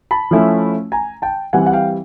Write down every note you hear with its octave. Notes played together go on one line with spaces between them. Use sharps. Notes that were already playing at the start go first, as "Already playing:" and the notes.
A5 B5
F3 A3 C#4 E4
G#5 A#5
G5 A5
E3 G3 C4 F#5 G#5
F#5
F5 G5